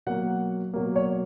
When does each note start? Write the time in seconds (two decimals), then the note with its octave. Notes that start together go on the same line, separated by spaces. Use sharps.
0.06 B2 F#3 A#3 F#5
0.74 B2 F#3 A#3
0.96 C#5